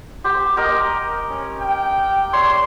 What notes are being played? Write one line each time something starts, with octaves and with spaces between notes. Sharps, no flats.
G4 C5
G4 A#4 D#5
C#4
G5
C#5 D5 E5 C6